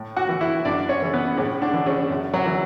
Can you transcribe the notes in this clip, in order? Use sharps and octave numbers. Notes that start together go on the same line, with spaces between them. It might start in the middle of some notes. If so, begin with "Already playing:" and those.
Already playing: A2
F#4 F#5
E3
E4 E5
F#2 D4 D5
C#4 C#5
C#3 E3
B3 B4
A2 C#3 C#4
D3 D4
E3
C#3 C#4
F#2
F#3 F#4
E3